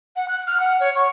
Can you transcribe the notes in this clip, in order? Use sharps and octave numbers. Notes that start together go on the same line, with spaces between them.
F#5
F#6
F6
F#5
C#5
C#6